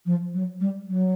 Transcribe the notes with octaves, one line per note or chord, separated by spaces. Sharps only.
F3
F#3
G3
F#3